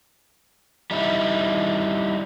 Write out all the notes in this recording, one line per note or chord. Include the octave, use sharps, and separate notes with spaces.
G3 D#4 E4